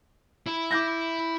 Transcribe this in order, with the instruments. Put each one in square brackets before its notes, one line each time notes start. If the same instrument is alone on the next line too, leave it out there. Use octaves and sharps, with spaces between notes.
[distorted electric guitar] E4
[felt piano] D6 G6 A#6